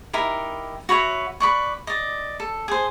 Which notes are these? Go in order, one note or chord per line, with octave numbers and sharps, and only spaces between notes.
D#4 E4 G4 A#4
F#4 B4 C#5 E5
B4 D5 C#6
D5 D#5
A4
G#4 C5